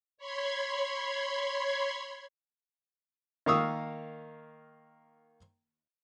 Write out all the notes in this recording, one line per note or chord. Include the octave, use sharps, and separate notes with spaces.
C#5 B5 C6 G#6
D#3 A#3 F5 C#6 D#6 E6